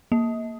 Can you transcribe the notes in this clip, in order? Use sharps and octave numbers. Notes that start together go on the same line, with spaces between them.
A#3